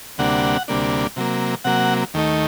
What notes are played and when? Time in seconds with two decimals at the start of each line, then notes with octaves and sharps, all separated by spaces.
0.18 D2 C3 G3 A#3 D4 F#5
0.68 D2 C3 G3 A#3 D4
1.16 C3 F#3 A#3
1.65 C3 F#3 A#3 F#5
2.14 D#2 D#3 A3 D#4